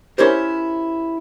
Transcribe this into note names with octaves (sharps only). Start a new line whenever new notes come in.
C#4 E4 G4 A#4 C5